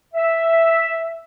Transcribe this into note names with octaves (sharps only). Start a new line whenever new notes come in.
E5